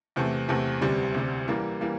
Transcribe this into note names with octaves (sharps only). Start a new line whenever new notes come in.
E2 C3 E3 A3
E2 C3 E3 A3
D2 C3 G3
D2 C3 G3
E3 G3 A#3
E3 G3 A#3